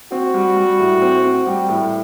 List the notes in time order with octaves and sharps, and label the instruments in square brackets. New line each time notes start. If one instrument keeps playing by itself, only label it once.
[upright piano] C4 [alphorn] F#4
[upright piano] G3
G3
A2
C4
C4
[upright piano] G3 [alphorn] G4
[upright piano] A2